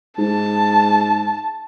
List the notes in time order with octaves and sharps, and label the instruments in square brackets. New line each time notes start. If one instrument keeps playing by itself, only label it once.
[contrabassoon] G#2 [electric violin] A5